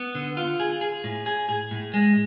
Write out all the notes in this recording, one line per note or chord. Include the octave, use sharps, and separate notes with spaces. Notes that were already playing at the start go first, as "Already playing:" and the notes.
Already playing: B3
D3
F4
G#4
G#4
A2
G#4
G#4
A2
G#3